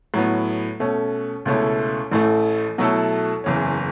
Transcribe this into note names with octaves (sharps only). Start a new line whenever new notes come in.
A2 F#3 B3
B2 A3 C#4
C#2 B2 A3 C#4 E4
A1 A2 A3
B2 F#3 A3 E4 A4
F#1 E2 E3 C#4